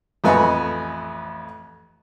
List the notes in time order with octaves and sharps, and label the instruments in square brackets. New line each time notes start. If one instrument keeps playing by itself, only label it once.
[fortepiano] A1 F2 B4 D#5 G#5 C#6